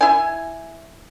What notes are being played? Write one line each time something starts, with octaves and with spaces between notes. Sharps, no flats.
E4 G#5